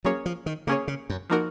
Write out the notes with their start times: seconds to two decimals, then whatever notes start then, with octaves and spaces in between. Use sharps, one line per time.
0.05 F#3 A#3 C#4 G#4 C#5
0.26 F3
0.46 D#3
0.67 C#3 A#3 C#4 G#4 C#5
0.88 C#3
1.10 F#2
1.30 F3 A#3 D#4 F#4 A#4